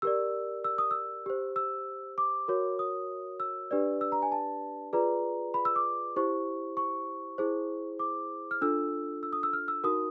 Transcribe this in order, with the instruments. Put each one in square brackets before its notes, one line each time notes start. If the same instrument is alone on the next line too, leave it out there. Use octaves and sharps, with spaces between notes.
[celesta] G4 A#4 D5 E6
E6
D#6
E6
G4 C5
E6
D6
F#4 A#4 C#5
D#6
E6
D4 G4 B4 D5
E6
A#5
G#5
A5
F4 G#4 B4 D5 A#5
B5
E6
D6
E4 G4 C5 C#6
C#6
E4 G#4 C5
D6
F6
D4 F4 A4 E6
E6
D#6
E6
F6
E6
D#4 F#4 A#4 D#6